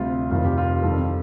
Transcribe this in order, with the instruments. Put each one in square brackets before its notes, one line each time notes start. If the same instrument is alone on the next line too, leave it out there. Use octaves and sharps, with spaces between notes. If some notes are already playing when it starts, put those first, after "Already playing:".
Already playing: [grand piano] D2 C3 G3 F4
F1 F2 D#3 G3 F4
G4
F4
F2 D#3 G3 A4